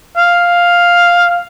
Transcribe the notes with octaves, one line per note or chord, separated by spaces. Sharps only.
F5